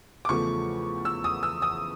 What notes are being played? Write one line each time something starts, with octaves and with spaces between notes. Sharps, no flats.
D6
E2 C#3 F3 A3 C#6
E6
D#6
E6
D#6